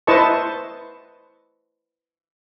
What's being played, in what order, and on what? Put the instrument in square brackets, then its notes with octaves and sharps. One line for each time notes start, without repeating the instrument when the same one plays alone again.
[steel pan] E4 B4 C5 D#5 A5 C#6